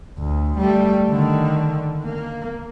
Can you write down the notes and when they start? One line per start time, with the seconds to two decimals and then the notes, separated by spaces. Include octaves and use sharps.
0.18 D2
0.58 G3 A3
1.09 D3 D#3
2.03 A#3